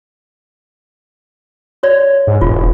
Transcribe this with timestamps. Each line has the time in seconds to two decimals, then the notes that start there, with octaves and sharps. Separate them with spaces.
1.83 F#4 C#5 D5
2.27 G#2
2.41 E1 F4